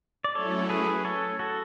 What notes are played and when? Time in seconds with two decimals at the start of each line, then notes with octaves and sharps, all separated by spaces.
0.24 D5
0.35 F#3 A3 C#4 E4 A4 C#5
0.70 G#4 B4
1.05 A4 C#5
1.39 F#4 A4